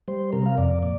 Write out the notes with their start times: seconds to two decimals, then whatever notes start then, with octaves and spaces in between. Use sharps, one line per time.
0.08 G3 C5
0.33 C3 A#4
0.46 F5
0.58 F2 D5
0.82 A#2 D5